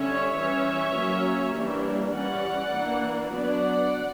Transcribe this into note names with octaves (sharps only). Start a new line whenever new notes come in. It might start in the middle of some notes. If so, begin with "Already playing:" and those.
Already playing: D3 G3 C#4 C#5 E5
E3 G3 C#4
F#3 A#3 C#4
E3 G3 A#3 D4
E3 G3 C#4 D5 F#5
E3 A#3 D4
F#3 B3 D4 D5 F#5